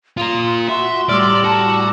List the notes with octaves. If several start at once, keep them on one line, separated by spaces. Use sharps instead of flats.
F4 A#4 C6 D#6
F#4 E5 C6
A2 G3 D5 A#5 D6 E6 F6
F#4 A5